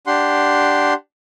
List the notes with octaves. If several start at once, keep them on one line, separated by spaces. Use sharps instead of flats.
D4 G4 F#5 C6